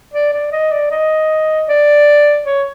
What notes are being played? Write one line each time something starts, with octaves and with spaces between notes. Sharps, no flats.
D5
D5
D#5
D5
D#5
D5
C#5